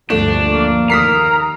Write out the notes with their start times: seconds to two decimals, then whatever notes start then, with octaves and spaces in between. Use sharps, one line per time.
0.10 D2 G2 F3 A3 D4
0.45 A#3
0.90 D#2 A#4 A#5 D#6 B6 C7